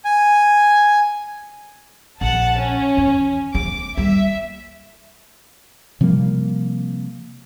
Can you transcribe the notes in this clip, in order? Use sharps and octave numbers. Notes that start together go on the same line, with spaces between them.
G#5
A#1 F#5 A5
C#4
E2
E2 A3 D6
G3 A#3 E5
C3 F3 G3 A#3